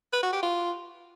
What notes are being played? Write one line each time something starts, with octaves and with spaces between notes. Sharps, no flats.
B4
F#4
G4
F4